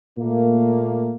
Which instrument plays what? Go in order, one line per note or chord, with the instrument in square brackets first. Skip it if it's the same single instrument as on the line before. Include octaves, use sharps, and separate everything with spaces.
[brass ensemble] A#2 A3 A#3